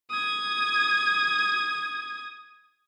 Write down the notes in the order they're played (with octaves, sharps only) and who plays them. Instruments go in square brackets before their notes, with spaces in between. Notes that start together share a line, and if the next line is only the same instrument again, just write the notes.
[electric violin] D#6 G#6